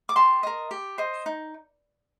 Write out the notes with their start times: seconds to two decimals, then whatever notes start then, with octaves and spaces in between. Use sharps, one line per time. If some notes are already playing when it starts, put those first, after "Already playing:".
0.09 D6
0.16 G4 A5 C6
0.43 A#4 D#5
0.71 G4
0.98 C5 D#5
1.26 D#4